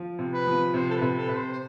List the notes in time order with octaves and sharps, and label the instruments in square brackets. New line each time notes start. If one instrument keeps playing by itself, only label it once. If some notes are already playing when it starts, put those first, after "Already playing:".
Already playing: [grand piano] F3 F4
C3
[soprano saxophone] B4
[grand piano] F3
[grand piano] C3 [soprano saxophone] C5
[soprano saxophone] A4
B4
[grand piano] C3
[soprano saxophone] A4
[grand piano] C3 [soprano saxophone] B4
[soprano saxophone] C5
C5